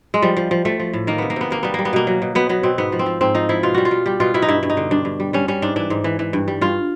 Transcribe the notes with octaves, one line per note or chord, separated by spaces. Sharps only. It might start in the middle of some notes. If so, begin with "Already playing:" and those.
G#3
F3 G3
F3
F3
F3 A3
F3
A2
D#3 A#3
C3 B3
A#3
C3 B3
C3 A#3
G3 B3
G3 A#3
B3
B2 A#3
F#3
B2
B2 B3
F#3 B3
B2 C4
G#2 B3
F3
C4
F3
G#2 C4
F3 D#4
F3 E4
B2 F4
G3 F#4
F4
G3
G3 G4
B2 F4
B2 E4
D#4
G2 E4
G2
D#4
D3
G2 D4
G2
G3
G3 C#4
G3 C#4
G#2 D4
E3 D4
G#2
E3
E3
G2
G3
G2 F4